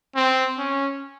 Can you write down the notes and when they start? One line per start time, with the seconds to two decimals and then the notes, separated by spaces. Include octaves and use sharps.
0.16 C4
0.58 C#4